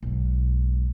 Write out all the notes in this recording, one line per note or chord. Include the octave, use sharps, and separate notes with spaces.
B1 G#2